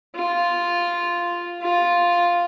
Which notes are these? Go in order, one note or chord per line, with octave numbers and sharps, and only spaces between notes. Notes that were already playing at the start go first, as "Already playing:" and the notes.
F4
F4